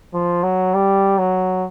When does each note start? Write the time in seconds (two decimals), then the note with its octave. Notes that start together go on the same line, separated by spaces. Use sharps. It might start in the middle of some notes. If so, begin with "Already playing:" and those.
0.13 F3
0.43 F#3
0.74 G3
1.18 F#3